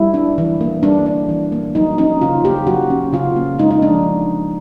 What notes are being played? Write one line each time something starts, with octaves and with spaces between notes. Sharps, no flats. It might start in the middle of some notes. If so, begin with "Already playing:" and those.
Already playing: G3 E4
D4
E3
A#3
G3 D4
D4
E3
A#3
F#3 D#4
C#4 D#4
C#3 F4
A#3 G4
F#3 F#4
C#4
C#3 F4
A#3
G#3 D#4
D#4
F3 D4